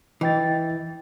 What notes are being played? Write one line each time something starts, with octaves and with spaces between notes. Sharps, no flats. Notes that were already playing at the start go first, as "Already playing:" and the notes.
E3 D#5 G5 A6